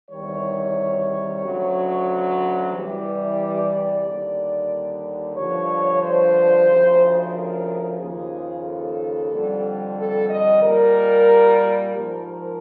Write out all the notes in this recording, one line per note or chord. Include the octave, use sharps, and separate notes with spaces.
E2 C3 D#3 G3 C#5
D2 C#3 F#3
E2 C3 E3 G3
D5
D#2 D3 G3
G2 D3 F3 C#5
C5
D2 C#3 F3
A#4
D#2 C#3 F3 G#4
A4
F2 D3 G3
A4
D#5
A#2 G3 A#4
G#2 F3 A#4
A#4